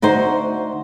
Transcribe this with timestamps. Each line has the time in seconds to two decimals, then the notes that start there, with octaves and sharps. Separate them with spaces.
0.02 D2 D#4 F#4 C5